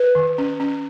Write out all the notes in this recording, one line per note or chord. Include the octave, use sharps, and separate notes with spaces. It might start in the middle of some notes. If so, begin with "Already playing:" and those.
Already playing: B4
D#3
C#4
C#4